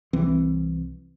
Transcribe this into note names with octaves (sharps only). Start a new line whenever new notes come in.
C2 E3 C4